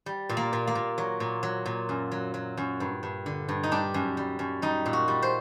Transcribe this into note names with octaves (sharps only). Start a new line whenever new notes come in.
G3
A#2
A#3
A#2
A#3
A#2
F#3
A#2
F#3
A#2
F#2
F#3
F#3
F#2
G2
G2
D3
G2
D#4
G3 D4
F#2
G3
F#2
G3 D#4
A#2
F#4
G3
C5